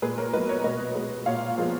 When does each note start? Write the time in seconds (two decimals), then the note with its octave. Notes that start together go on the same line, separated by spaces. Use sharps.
0.02 A#2 G#4 B4
0.18 A#4 C#5
0.33 B3 B4 D#5
0.36 F#3
0.49 A#4 C#5
0.64 B2 B4 D#5
0.95 G#3 B3
1.26 A#2 C#5 F5
1.58 F3 G#3 B3